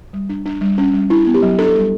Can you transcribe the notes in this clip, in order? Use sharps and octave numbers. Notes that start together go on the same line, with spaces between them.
G3
D4
D4
G3
C#4
G3
D4 E4
B3
G4
F#3
D4 A4
G3